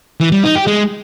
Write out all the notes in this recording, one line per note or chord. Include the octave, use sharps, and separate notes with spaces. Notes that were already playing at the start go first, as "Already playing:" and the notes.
E3
G3
D#4
G4
G#3